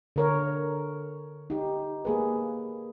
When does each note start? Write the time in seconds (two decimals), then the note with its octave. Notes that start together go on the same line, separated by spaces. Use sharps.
0.16 D3 A#4 C#5
1.50 D#4 G4
2.05 A#3 G#4 B4